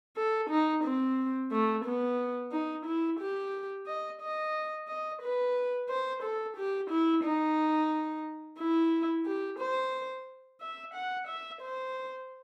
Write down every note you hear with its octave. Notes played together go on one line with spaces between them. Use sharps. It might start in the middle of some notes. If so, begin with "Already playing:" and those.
A4
D#4
C4
A3
B3
D#4
E4
G4
D#5
D#5
D#5
B4
C5
A4
G4
E4
D#4
E4
G4
C5
E5
F#5
E5
C5